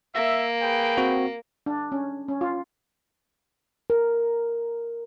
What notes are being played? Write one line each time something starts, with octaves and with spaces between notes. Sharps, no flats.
A#3 E5
G#4 B4 G5
C4 F#4
D4
C#4
C#4
F4
A#4